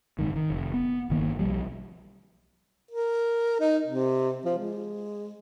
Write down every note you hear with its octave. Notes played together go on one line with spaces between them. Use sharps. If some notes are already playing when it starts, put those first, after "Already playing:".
F#1 G#2 D#3
D#3
F1
B3
G1 D#3 A#3
B1 F3 G3
A#4
D#4
C3
F3
G#3